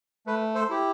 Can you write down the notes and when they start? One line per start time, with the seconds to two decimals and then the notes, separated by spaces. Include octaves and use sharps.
0.26 A3 B4
0.55 A4 C5
0.69 E4 G4